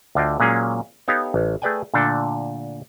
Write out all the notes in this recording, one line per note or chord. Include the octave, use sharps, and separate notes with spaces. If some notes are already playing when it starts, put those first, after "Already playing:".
D2 D3 F4 D#5 G5
A#2 F#3 G#3 A#3 C#4 G#4
B3 D#4 G4 A4 C#5 F5
A1
A3 G#4 B4 D5 G5 G#5
A#2 D3 A3 D4 A4